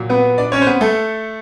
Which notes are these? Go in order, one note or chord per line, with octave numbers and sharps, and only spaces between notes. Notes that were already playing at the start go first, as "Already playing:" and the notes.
Already playing: A#2 F#3
B3 B4
D4 D5
C#4 C#5
C5
B3 B4
A3 A4